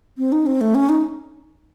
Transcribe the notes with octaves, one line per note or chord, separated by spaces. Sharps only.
C4
D#4
C4
A3
C#4
D#4